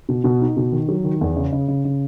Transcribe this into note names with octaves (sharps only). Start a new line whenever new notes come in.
B2
B2
D#4
B2
D#3
F#3
D#3
E2
C#3
C#3
C#3
C#3